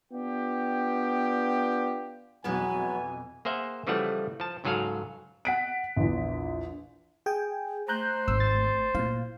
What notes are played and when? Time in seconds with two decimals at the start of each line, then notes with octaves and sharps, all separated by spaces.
0.13 B3 D4 F4 G4 G5
2.44 F2 B2 E3 F#3 G#3 B3 G#5
3.45 A#3 G#4 C5 E5 F#5
3.87 C#3 E3 F3 G3 A3 F#5
4.40 F3 A5
4.64 C#2 G#2 F#3 G#4 A4 F5
5.45 F#5 B6 D7
5.97 A#1 E2
7.26 G#4 G5 G#5
7.88 A3 C5 A#5 F#6 G6
8.28 G#1 E6
8.40 A6
8.95 A#2 E4 F5